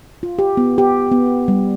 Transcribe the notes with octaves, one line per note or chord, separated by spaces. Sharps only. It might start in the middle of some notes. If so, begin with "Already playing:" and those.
F4
G4
B3
G4
B3
G3